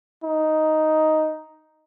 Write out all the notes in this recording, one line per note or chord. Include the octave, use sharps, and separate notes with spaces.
D#4